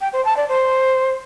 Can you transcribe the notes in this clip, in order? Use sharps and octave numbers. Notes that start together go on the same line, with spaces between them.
G5
C5
A5
D5
C5